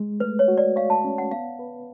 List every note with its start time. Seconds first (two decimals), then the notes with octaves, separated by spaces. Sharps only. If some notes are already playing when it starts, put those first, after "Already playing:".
Already playing: G#3
0.20 A3 B4
0.39 C#5
0.48 F#4
0.58 D5
0.76 C#5 F5
0.90 A5
1.04 C#4
1.18 F#5
1.31 B3 F5
1.59 B4